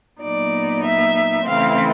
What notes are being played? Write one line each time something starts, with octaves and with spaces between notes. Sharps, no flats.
A#2 F#3 B3 D#4 D5
E5
C#3 E3 A3 C4 F5